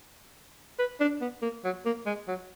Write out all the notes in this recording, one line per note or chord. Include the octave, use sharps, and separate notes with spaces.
B4
D4
B3
A#3
F#3
A#3
G#3
F#3